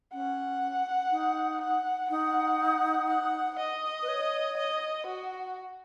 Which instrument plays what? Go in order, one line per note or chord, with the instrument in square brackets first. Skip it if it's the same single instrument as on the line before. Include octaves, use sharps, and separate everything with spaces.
[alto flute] C#4 [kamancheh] F#5
[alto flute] D#4
[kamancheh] F#5
[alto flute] D#4 [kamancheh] F#5
[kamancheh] F#5
D#5
[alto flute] B4
C#5
[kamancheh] D#5
F#4